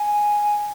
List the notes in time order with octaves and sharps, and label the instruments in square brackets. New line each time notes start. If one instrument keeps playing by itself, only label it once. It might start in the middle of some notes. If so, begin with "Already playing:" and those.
Already playing: [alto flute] G#5